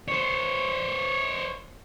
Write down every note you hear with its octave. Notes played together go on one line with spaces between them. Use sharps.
C5 C#5